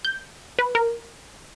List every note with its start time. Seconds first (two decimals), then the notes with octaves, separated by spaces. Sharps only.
0.05 G6
0.59 B4
0.75 A#4